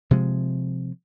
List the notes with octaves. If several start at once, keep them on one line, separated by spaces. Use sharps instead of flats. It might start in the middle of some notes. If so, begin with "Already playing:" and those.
C3 F3 G#3